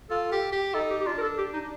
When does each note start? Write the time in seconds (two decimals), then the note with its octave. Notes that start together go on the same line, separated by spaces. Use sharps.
0.10 F4 A4
0.32 G4
0.52 G4
0.74 D#4 A4
0.90 G4
1.01 G4
1.06 D4 F4
1.18 A#4
1.22 A4
1.38 G4
1.54 D#4